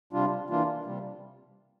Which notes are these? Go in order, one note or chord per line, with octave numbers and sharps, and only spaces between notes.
C3 G3 D4 F4
E3 A#3 D4 F4
C3 G3